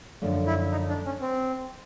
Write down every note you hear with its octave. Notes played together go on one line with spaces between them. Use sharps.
F#2 D3 F3 A3
E4
D#4
D4
C#4
C4